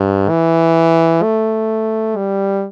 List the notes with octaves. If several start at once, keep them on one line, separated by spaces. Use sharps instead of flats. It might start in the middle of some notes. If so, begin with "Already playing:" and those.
Already playing: G2
E3
A3
G3